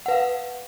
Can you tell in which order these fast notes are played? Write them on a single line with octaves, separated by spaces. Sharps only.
F#5 B4 F5